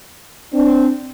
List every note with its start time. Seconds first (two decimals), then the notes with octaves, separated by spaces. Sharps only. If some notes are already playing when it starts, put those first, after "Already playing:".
0.53 C4 D4